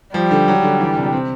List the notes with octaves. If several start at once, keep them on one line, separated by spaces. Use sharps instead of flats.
F3 G3
D3
F#3
D3
E3
C3
C4